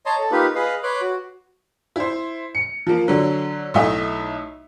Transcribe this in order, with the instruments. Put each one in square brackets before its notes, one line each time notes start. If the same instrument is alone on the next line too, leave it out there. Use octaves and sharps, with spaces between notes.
[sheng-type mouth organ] C#5 D#5 A5 A#5 C6
A4
A#3 D#4 F4 G4 B4
G#4 B4 D#5 F5
B4 C#5 C6 D6 F#6
F#4
[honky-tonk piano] E4 C5
C#7
F3 A#3
D3 F#3
B1 A3 E4 D#5 E5